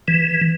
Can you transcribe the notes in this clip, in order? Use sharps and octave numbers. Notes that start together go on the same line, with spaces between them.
E3